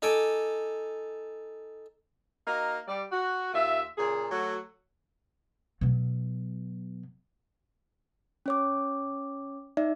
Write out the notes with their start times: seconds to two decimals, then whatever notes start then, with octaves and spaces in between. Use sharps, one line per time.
0.02 D#4 A4 G#5 A5 D6
2.46 A#3 D#4 F#4 F5
2.87 G3 D5
3.12 F#4
3.53 D#2 F4 E5
3.97 A#2 C#3 G#4
4.30 F#3 A3 F#4
5.81 B2 F#3
8.46 C#4 C#5 D6
9.77 D#4 D5 E5